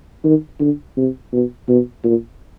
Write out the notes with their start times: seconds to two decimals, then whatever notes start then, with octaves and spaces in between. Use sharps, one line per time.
0.25 D#3
0.60 D3
0.97 C3
1.33 B2
1.69 B2
2.04 A#2